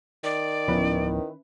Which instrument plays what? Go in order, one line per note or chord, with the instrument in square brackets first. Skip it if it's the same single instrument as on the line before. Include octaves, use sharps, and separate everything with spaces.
[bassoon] D#3 [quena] D5
[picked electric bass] D1 F3 B3 [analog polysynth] C#4 E4 B4